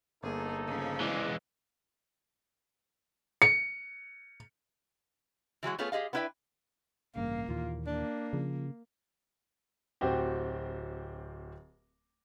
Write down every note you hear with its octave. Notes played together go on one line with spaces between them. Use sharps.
G1 A#3 D#4 G#4 A4
C#3 F3
E3 G#3 G#4 D5
C#7
E3 F#3 G#3 F#4
A3 B3 F4 G#4 A4 C#5
G4 G#4 D#5 F5
B3 D4 E4 B4 E5 G5
A1 G2 C#3 A#3 F5
D#2 A#2 E3 F4
A#3 D4
C#3 F3
D1 C4 F#4 G4